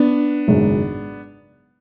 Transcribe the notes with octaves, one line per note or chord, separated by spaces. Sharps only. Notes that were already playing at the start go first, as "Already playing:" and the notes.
Already playing: B3 D4
G#1 F#2 C#3